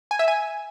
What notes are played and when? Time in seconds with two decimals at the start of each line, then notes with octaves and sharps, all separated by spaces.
0.11 G#5
0.19 E5
0.28 G#5